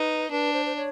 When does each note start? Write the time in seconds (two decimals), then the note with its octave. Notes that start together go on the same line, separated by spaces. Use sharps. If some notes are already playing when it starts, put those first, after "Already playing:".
Already playing: D#4 B4
0.31 D4 B4
0.53 C5
0.66 C5
0.76 C#5